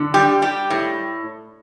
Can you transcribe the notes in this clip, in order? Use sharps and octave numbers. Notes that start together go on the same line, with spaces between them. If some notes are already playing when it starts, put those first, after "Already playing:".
Already playing: D3
G3 G4
G3 G4
A2